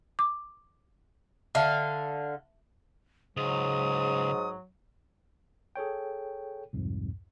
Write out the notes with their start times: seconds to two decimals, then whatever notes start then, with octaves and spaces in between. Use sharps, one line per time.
0.19 D6
1.55 D3 E5 F5 A5
3.37 C#2 G#2 F#3 D#6
5.76 G#4 A4 C#5 G5
6.73 C2 F2 G#2